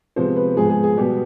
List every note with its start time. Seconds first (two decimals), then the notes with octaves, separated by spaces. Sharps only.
0.16 C3 F3 G#3 B3 C5
0.36 B4
0.56 G#2 F3 G#3 B3 G#4
0.70 G#4
0.83 G#4
0.97 B2 G3 B3 G4